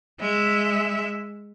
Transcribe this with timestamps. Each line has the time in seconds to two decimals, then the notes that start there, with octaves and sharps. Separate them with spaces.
0.20 G#3 E5